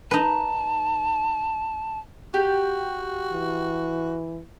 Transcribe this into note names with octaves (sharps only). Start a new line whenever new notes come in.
D#4 B4 A5
F#4 G4
E3